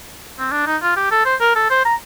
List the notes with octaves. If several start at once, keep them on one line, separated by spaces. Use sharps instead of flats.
C4
D4
D#4
F4
G4
A4
C5
A#4
A4
C5
A#5